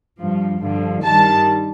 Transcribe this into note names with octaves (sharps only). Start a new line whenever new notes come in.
G2 F3
G2 D3 F3
G2 D#3 G3 A5